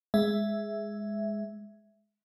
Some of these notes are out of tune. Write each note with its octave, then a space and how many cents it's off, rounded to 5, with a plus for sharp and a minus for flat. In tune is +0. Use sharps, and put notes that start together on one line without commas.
G#3 +0 E5 +0